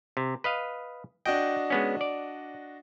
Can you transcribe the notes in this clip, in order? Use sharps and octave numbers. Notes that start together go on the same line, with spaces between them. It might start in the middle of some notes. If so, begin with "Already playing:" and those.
C3
B4 D#5 F5
D4 F#4 D#5 G5
G#3 B3 C#4
D5